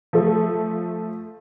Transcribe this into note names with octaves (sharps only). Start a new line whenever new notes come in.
F3 A3